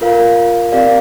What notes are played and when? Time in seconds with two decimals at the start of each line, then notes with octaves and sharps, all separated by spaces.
0.01 F4 A#4 F5
0.72 C4 G4 A#4 D5 F5